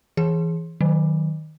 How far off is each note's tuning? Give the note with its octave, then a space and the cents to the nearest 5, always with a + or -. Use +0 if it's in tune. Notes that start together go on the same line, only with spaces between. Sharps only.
E3 +0 G#4 +0
D#3 +0 F#3 +0